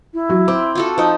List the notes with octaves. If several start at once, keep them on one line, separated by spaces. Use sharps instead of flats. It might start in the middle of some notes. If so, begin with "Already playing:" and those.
E4
F#3 F#4
C4 D6
F4 F#4 A4
F3 D#4